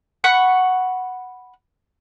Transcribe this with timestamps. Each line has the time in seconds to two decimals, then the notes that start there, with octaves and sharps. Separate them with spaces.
0.24 F#5 B5 C#6